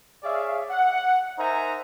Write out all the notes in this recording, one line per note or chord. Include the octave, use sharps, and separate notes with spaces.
G#4 C#5 D5 E5 F5
F#5
D#4 A#4 C5 E5 G#5 A#5